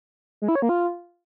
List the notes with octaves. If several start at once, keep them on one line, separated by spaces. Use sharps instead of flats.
G#3
E4
C#5
A#3
F4